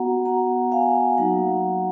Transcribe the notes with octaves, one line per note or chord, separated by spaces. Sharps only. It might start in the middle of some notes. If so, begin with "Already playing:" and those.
Already playing: B3 F#4 F#5 A#5
B3 F#4 F#5 A#5
F5 G#5
F#3 A#3 D#4 F#4 F#5 A#5